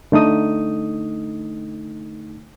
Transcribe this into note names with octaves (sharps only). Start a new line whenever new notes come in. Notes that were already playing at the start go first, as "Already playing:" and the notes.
D3 A3 D#4 D#6